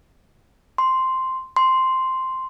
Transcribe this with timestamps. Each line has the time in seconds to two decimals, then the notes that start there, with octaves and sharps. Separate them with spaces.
0.78 C6
1.56 C6